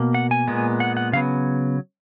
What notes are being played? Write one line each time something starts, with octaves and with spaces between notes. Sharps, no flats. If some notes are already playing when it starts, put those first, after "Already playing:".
Already playing: B2 A#3
F#5
G#5
A#2 G#3 B3
F#5
F#5
C#3 F#3 B3 F5